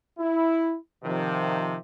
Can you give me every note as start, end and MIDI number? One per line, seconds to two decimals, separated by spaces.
0.19 0.76 64
1.04 1.76 48
1.04 1.76 51
1.04 1.76 53